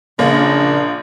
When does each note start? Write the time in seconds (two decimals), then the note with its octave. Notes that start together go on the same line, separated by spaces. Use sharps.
0.19 A#1 C#3 A#3 D4